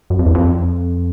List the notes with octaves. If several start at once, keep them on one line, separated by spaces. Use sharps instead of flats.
F#2
F2
E2
F2